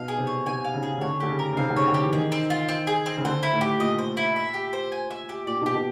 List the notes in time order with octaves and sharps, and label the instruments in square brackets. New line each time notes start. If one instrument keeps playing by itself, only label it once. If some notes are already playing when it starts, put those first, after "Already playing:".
Already playing: [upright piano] B2 [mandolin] F5
[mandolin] G#4
[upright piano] C3
[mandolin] C#5
[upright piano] C3 [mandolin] G#5
[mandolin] F5
[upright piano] C#3
[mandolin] G#4
[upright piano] C#3
[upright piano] D3 [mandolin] C#5
[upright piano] D3 [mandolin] G4
[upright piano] C#3
[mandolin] A#4
[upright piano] C#3
[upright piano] C3 [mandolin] F5
[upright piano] D3
[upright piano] C#3 [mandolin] C#5
[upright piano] D3
[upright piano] C#3 [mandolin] G4
[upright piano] E3
[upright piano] D#3 [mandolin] G#4
[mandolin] C4
F4
C4
G#4
C4
[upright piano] C#3
[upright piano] D3 [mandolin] C5
[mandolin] E4
[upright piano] A2
[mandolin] G4
[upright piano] A#2 [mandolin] D#5
[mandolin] C5
E4
E5
G4
C5
G#5
E5
G4
[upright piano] A#2 [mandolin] D5
[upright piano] B2
[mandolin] G4
[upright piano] B2